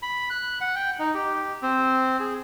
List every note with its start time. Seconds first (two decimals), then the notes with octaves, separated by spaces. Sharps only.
0.02 B5
0.30 F#6
0.61 F#5
0.76 G5
0.99 D#4
1.14 G4
1.62 C4
2.20 G#4